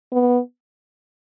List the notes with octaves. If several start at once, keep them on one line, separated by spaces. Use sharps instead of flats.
B3